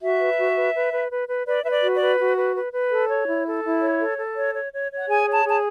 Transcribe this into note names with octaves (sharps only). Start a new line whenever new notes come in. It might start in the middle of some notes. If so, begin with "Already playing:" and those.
F#4 E5
B4
F#4
B4
B4
B4
B4
B4
B4 D5
B4 E5
D5
F#4
D5
B4
F#4
B4
B4
B4
A4
C#5
E4
A4
E4
C#5
A4
A4
C#5
C#5
C#5
C#5
F#5
G#4 G#5
C#5
A5
G#4 A5